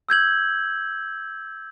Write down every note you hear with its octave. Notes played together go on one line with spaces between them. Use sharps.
E6 G6 G#6 F#7